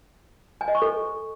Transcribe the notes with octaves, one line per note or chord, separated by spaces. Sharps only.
G#5
D#5
C#6
A4